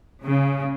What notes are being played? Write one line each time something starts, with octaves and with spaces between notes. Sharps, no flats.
C#3